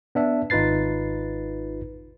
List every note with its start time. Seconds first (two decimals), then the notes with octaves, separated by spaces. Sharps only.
0.15 B3 D4 E5
0.50 G#1 D#4 F4 B4 A6 C7